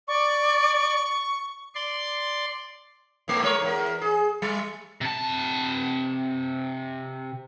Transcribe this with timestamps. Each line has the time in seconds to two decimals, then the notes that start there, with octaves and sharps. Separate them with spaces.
0.08 D5 C#6
1.75 D5 C6
3.28 A2 A3
3.43 G#3 A#4 C#5
3.62 E2 A#4
4.01 G#4
4.42 G3
5.01 C3 A5